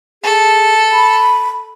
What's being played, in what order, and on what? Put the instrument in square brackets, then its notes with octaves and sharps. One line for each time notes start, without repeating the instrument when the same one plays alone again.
[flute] G#4 [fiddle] A4
[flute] B5